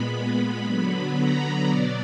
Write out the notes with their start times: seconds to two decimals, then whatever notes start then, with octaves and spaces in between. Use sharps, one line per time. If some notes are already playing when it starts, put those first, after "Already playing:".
Already playing: A#2 G#3 B3 B5
0.64 D3 F#3 B3
1.14 A#5
1.66 B2 F#3 B3 D5